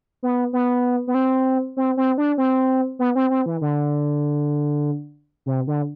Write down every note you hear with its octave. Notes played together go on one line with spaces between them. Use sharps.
B3
B3
B3
C4
C4
C4
D4
C4
B3
C4
C4
E3
D3
C3
D3